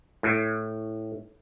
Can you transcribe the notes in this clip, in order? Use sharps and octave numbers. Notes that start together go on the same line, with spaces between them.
A2